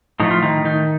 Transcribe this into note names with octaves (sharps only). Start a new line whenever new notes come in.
A2 F3 A3 D#4
F4
D#3 D#4
D#3 D#4